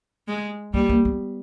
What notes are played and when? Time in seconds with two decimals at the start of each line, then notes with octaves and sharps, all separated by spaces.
0.28 G#3
0.74 G3 A#3
0.89 A#3
1.05 B3